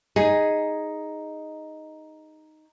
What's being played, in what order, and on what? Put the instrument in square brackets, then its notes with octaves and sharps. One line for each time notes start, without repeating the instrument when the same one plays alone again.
[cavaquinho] D#4 G#5 [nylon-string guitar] G#4